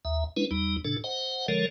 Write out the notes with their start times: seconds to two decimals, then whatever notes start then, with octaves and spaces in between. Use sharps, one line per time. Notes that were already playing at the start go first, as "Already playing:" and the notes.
0.05 D#2 E5
0.36 G#3 C#4 D4 E4 B4
0.51 E2 G3 D#4
0.85 A2 C#3 D4 A4
1.04 C5 D#5 F#5
1.48 D3 F3 G#3 A4 A#4 C#5